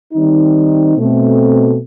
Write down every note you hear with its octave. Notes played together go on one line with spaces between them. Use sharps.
D#3 G3 C4 D#4
B2 A3 C4